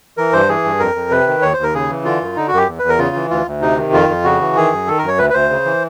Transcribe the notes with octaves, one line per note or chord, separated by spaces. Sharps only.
E3 A#4
G2 C5
E3 G#4
G2
F2 A#4
F2
C3 B4
D#3
D#2 C#5
D#2 C5
A#4
C#3 G#4
E3
D3 F4
F#2
D3 D#4
F#4
F#2 G4
E2
E2 B4
A#4
C#3 F4
E3
D2 F4
D2
C3 D#4
D#3
F2 F4
F2
C#3 F#4
E3
D#3 G#4
F#2
D#3 A4
F#2 A#4
C#5
D2 B4
B4
D2 C5
C#3
E3